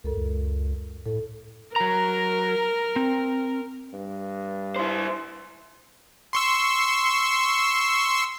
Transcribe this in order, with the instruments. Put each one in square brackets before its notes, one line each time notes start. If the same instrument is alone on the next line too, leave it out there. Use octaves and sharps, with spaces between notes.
[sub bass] C#2 [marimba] F#2 A4 A#4
[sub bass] C#2
[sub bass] A2 [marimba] A4
[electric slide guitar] F#3 A#5 [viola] A#4
[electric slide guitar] C4
[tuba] G2
[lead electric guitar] E4 C5
[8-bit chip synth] C6 C#6 E6